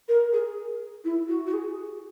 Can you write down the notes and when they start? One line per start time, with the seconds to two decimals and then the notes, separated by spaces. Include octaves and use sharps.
0.08 A#4
0.32 G#4
1.04 E4
1.28 F#4
1.46 F#4
1.53 G#4